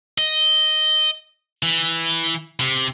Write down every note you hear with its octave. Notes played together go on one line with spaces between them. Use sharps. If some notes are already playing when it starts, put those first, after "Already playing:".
D#5
E3
C3